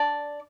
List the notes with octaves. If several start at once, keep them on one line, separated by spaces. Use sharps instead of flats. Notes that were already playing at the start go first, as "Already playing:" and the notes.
Already playing: D4 D5